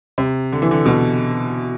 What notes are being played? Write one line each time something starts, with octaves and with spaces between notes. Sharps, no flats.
C3
D3
E3
D3
B2